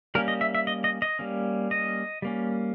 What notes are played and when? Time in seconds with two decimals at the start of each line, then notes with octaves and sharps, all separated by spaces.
0.15 G3 A#3 C#4 A#4
0.28 D#5
0.41 E5
0.55 E5
0.67 D#5
0.84 D#5
1.02 D#5
1.19 G3 A#3 C#4
1.71 D#5
2.22 G3 A#3 C#4